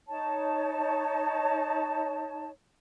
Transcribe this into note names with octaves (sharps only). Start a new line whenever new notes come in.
D#4 C#5 A5